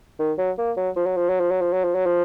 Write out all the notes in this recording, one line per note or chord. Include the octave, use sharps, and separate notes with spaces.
D#3
F#3
A#3
F#3
F3
F#3
F3
F#3
F3
F#3
F3
F#3
F3
F#3
F3